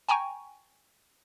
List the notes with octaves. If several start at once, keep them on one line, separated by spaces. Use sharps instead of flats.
G5 G#5 A#5 C#6